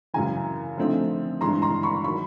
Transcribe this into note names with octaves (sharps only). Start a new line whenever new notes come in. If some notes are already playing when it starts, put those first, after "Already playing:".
F#2 C#3 E3 G#5 A#5
D3 F3 A3 C4 D#4
G2 E3 G#3 A#5 C6
A#5 C6
B5 C#6
D#3 F#3 B5 C#6